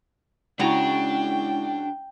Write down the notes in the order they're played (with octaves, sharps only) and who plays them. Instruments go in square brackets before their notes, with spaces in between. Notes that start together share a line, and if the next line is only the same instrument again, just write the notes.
[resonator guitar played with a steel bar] C#3 F#4 A#5 [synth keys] G#3 C#4 E4 [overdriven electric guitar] D4 [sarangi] G5